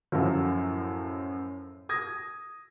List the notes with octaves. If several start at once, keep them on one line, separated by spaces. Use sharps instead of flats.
F#2 A2 F3 F#3
D#6 G#6 A#6